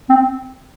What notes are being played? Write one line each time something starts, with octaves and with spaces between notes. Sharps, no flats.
C4